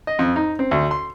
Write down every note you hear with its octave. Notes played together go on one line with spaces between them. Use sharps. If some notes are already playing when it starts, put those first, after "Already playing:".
D#5
F2
D#4
C4
D2
C6